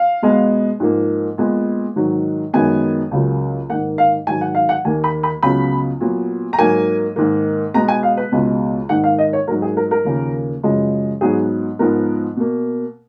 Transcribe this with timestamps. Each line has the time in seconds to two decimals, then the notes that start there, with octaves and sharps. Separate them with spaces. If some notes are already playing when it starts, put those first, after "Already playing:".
Already playing: F5
0.22 B2 G#3 B3
0.80 G#2 F3 A#3
1.38 A#2 G#3 B3
1.96 G#2 D#3 F#3
2.53 F#2 D#3 G#3 B3 G#5
3.11 C#2 C#3 F#3 A#3
3.69 G#2 D#3 A#3 F#5
3.98 F5
4.27 G#2 D#3 F#3 G#5
4.41 F#5
4.55 F5
4.69 F#5
4.85 D#2 D#3 A#3 G#5
5.04 B5
5.23 B5
5.43 C#2 C#3 F#3 B3 B5
6.01 A#2 F#3 B3
6.53 A#5
6.59 G#2 F#3 A#3 G#5
7.16 G#2 D#3 A#3
7.74 B2 G#3 B3 A#5
7.88 G#5
8.03 F5
8.17 B4
8.32 C#2 B2 G#3
8.89 G#2 D#3 A#3 F#5
9.04 F5
9.18 D#5
9.33 C#5
9.47 G#2 F#3 A#3 A#4
9.62 G#4
9.77 A#4
9.91 A#4
10.05 D#2 C#3 F3 A#3
10.63 F#2 C#3 F3 G#3
11.21 G#2 F#3 B3 G#4
11.79 G#2 F3 B3 A#4
12.36 B2 A#3